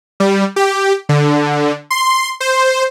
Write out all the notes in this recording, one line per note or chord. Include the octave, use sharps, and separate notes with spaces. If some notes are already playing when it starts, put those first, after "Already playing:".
G3
G4
D3
C6
C5